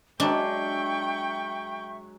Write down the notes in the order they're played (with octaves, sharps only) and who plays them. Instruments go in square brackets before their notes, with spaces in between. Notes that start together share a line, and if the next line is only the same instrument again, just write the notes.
[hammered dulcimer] F#3 G#3 [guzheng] D4 [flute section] E5 C#6 [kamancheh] G5